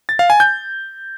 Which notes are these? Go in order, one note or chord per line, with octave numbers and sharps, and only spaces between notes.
A6
F5
G#5
G6